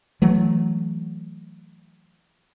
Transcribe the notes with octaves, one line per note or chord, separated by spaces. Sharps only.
E3 F#3 A3